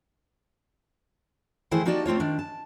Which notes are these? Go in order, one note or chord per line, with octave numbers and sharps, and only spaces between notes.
D#3 E3 A3 E4 G#4 C5
A#3 D#4 F#4 G4 D5 A5
A3 C4 F4 C#5
D#3 D4
A5